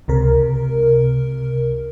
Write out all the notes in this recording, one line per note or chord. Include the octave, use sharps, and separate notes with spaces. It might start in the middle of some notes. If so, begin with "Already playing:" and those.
C#2 C3 A#4